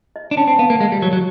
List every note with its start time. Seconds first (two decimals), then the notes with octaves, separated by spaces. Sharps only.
0.16 D#5
0.31 D4
0.37 C#4 A5
0.48 C4
0.59 B3 F5
0.70 A#3
0.80 G#3 F5
0.92 G3
1.02 F#3 C#5
1.13 F#3